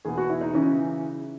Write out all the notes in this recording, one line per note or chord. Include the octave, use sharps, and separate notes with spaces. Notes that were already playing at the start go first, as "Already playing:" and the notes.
E2 B2 G#4
F#4
E4
D#4
C#3 E3 C#4